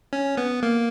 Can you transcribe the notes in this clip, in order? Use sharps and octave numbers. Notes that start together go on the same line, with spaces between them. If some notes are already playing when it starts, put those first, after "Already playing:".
C#4
B3
A#3